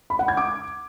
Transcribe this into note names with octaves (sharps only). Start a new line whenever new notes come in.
B5
F#5
G#6
D6